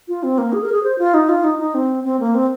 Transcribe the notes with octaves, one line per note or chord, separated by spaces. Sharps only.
F4
C4
A#3
G#4
A#4
G#4
C5
F4
D#4
F4
D#4
D#4
C4
C4
A#3
C4